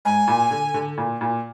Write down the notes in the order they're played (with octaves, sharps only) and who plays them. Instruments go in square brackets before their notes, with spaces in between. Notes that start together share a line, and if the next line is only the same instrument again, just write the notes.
[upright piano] G#2 [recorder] G#5
[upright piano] A#2
D3
D3
A#2
A#2